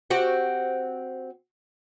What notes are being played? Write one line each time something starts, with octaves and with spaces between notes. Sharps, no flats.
C4 F#4 G4